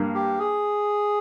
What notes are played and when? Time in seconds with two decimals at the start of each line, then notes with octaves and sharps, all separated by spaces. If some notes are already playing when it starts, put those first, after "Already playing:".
Already playing: G2 A#3
0.15 G4
0.39 G#4